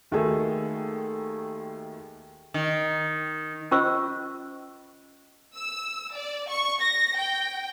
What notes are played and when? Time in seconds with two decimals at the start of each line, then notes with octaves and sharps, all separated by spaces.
0.11 D#2 D#3 A3 F#4 G#4 A4
2.54 D#3
3.71 C#4 F4 C5 D#5 C#6 E6
5.55 E6
6.14 D5
6.49 C#6
6.80 A#6
7.17 G5